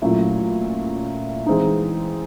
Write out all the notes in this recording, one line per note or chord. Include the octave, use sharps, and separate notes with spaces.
A#2 F#3 A3 C#4 E4
E3 G#3 C4 D#4